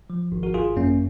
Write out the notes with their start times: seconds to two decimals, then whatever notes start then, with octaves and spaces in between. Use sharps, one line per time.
0.10 F3
0.32 G#1
0.43 F#4 A#4
0.54 G#1 F4 G#4
0.77 F#2 A#3 C#4